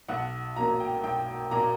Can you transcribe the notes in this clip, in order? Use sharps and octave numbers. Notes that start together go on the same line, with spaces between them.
B1 F#5
A#2 F#3 A#3 A#5
G5
B1 G5
A#2 F#3 A#3 A#5